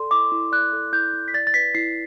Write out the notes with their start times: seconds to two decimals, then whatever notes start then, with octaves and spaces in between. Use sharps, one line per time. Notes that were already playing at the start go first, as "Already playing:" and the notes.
Already playing: A4 D5 C6
0.11 E4 D6
0.32 E4
0.52 D5 F#6
0.73 A4
0.93 E4 G6
1.14 E4
1.28 B6
1.34 D5 A6
1.47 A6
1.54 B4 B6
1.75 E4 C7